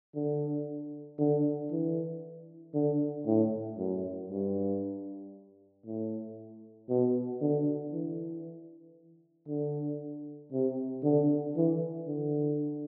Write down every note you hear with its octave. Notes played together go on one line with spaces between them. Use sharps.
D3
D3
E3
D3
A2
F#2
G2
A2
B2
D3
E3
D3
C3
D3
E3
D3